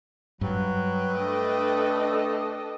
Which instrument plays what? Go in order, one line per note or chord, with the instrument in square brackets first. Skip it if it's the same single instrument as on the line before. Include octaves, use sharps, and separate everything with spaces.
[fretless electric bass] G2 [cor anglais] F#3 [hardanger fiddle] B4 G5
[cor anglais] A3 [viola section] D4 A4 D#5